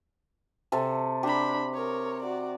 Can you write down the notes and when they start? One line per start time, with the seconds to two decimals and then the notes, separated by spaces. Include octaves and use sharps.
0.72 C3 A4
1.23 D4 G4 A#5 B5
1.74 A#4 C#5
2.22 F#4 D5